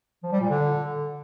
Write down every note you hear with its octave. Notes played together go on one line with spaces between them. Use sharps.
F3
G3
A#2
D3